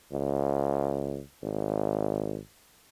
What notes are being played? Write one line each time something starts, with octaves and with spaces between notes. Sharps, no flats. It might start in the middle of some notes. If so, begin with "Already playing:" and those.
C#2
G#1